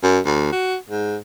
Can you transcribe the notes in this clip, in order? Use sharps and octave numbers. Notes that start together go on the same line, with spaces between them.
F#2
D2
F#4
G#2